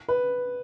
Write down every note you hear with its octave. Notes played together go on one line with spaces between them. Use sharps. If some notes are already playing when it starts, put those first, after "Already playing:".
B4